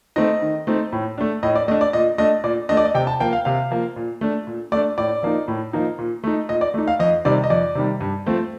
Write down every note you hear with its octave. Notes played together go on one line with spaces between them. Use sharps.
A3 C4 D#4 D#5
D#3
A3 C4 D#4
A2
A3 D4
A2 D#5
D5
A3 D4 D#5
D5
A#2 D#5
A3 D4 D#5
A#2 D5
A3 D4 D#5
D5
D#5
C3 G5
A5
F3 A#3 G5
F5
C3 F5
F3 A#3
A#2
A3 D4
A#2
A3 D4 D5
A2 D5
F3 A#3 D#4
A2
F3 A#3 D#4
A#2
A3 D#4
A#2 D#5
D5
A3 D#4
F5
F2 D#5
C3 D#3 G3 D5
D#5
F2 D5
C3 D#3 G3
G2
F3 A3 C4